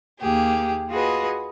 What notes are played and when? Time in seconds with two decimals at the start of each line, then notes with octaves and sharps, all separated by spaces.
0.21 D#2 A#3 G4 G#4
0.90 F4 F#4 G#4 B4 D#5